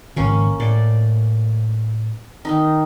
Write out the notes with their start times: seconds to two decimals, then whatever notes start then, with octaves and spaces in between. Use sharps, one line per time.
0.16 G#1 C#3 A#3 C#4 C#5
0.60 A2 D5
2.45 D#3 D#4